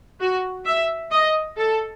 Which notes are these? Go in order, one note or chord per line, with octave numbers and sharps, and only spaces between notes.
F#4
E5
D#5
A4